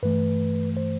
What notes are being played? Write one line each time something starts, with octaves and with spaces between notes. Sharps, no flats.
G2 E3 A3 B4
C5